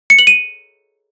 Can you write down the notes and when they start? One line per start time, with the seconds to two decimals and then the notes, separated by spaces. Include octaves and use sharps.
0.10 C#7
0.19 F#7
0.27 D#7